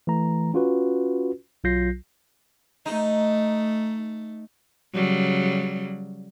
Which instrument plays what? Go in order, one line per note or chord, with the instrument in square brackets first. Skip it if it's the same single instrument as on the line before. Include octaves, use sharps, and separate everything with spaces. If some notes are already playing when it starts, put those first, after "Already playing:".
[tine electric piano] E3 A3 A#5
C#4 F4 F#4 B4
B1 F#3 F4 G6 A#6 C7
[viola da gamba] A3 [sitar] D#4
[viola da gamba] C#3 F#3 G3